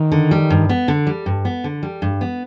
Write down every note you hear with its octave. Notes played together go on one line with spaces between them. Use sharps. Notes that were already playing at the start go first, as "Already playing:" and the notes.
Already playing: D#3
D3
G3
G2
B3
D3
G3
G2
B3
D3
G3
G2
B3